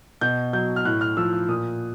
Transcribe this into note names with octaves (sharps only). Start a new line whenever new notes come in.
B2 G6
F#3 G6
F6
A2 F#6
F6
F3 E6
E6
A#2 D#6